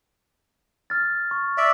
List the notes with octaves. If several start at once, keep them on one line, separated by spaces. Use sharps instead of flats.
F6 A6
C#6
D5 E5